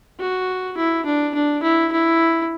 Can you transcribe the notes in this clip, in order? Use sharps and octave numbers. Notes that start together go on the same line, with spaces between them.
F#4
E4
D4
D4
E4
E4